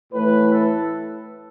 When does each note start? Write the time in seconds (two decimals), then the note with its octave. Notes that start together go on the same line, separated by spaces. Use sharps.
0.13 A2 E3 A3 B4
0.52 A4